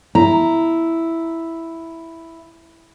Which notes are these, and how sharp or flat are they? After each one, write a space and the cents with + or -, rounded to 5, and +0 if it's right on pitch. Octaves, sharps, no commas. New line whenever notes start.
E4 +0 A#5 +0